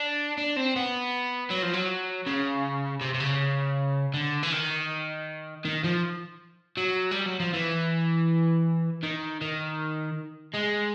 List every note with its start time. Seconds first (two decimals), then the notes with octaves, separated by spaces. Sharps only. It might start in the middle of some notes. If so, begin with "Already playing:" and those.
Already playing: D4
0.38 D4
0.56 C4
0.76 B3
1.51 F#3
1.63 F3
1.74 F#3
2.27 C#3
3.01 C3
3.14 C3
3.20 C#3
4.14 D3
4.43 E3
4.52 D#3
5.65 D#3
5.84 F3
6.77 F#3
7.12 G3
7.26 F#3
7.40 F3
7.53 E3
9.03 D#3
9.41 D#3
10.54 G#3